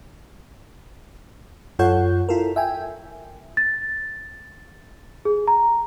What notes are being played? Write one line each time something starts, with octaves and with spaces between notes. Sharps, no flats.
F#2 F4 A4 C#5 F#5 G6
E4 F4 A4 A#4
E5 G5 G#5
A6
G#4
A#5